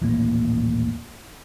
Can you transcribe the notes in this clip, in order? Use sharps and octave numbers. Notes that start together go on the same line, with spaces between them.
D#1 A1 A2 A#3